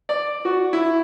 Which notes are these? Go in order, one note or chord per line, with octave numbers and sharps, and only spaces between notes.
D5
F#4
E4